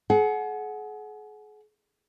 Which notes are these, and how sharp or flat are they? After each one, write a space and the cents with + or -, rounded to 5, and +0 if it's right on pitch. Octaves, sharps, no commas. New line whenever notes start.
G#4 +40 F#5 +0